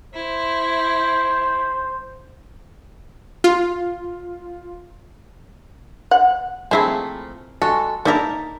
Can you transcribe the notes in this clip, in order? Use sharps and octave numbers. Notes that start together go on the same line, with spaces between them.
E4 C5
F4
F#5
F3 A3 A#3 C4 E4 G#4 C5
G#3 F#4 A4
A#3 D#4 E4 A#4 D5 A5 A#5